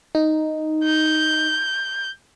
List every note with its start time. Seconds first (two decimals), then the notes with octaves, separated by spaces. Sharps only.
0.15 D#4
0.84 G6